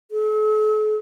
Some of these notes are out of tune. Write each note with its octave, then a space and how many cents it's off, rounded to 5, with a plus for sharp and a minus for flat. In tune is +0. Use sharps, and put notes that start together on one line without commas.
A4 -45